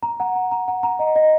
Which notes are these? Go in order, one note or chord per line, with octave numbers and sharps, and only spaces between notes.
A#5
F#5
A#5
A#5
F#5
A#5
D#5
D#5